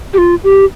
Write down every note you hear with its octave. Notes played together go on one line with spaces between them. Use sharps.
G4
F4
G4